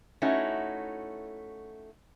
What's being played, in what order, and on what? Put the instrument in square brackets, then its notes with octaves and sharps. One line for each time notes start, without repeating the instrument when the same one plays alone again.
[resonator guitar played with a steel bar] A3 C#4 D#4 E4 F#4